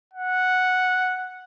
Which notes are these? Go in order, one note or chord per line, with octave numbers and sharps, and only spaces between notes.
F#5